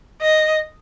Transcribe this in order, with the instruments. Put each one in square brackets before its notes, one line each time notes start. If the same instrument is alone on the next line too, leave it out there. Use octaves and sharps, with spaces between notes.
[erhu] D#5